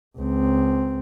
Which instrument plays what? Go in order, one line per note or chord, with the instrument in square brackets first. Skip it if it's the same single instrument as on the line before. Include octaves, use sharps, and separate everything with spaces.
[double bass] C#2 C4